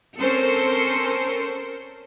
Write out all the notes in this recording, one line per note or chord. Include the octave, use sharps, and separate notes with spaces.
C4 C#4 A4 A#4 C5